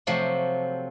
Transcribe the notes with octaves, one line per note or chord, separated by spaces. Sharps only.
C3 F3 F#3 A3